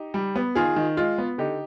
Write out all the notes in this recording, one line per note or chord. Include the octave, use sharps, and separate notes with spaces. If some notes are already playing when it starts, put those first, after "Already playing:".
Already playing: D#4 G4
G3
B3
D#3 F4 G#4
D#3
G#3 F4
B3
D3 D#4 G4